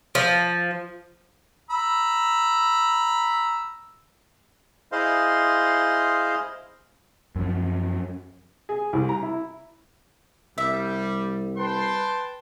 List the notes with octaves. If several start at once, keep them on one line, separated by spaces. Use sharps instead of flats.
F3
A#5 B5 E6
E4 G#4 C5 D#5 F5 C6
F#2 F3
G#4
C2
A#5
E4
C2 G3 E5
B4 G5 A5 C6